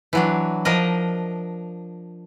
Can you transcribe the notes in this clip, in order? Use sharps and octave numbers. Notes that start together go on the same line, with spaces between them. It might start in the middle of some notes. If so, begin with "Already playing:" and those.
E3 F#3 D4
F3 D4 A#4 D#5